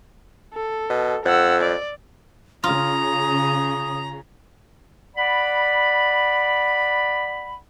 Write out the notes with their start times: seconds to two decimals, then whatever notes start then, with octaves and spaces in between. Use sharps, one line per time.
0.54 A4
0.90 B2
1.25 F2 F#5 E6
1.61 D5
2.64 C#3 F4 A#5 D#6
5.16 D5 F#5 B5